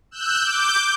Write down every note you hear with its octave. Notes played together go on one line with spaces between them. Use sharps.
E6 F#6 G6
D6 G6